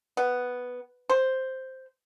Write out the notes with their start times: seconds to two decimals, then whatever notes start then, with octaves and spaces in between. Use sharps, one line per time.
0.17 B3
1.10 C5